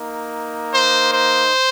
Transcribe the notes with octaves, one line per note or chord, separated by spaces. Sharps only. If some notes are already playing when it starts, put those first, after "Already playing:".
Already playing: A#3 D#4
C5
C5